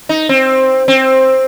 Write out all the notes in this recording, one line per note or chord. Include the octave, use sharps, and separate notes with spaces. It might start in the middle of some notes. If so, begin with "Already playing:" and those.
D#4
C4
C4